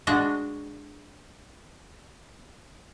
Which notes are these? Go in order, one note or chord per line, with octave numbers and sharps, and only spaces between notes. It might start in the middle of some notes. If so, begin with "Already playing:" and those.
G#3 D4 F#4